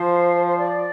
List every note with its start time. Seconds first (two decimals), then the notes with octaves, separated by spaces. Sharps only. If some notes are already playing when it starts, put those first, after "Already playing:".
Already playing: F3 C5
0.47 C5
0.57 D5